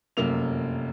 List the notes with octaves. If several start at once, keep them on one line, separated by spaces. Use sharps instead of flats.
F1 F#2 A#3 F7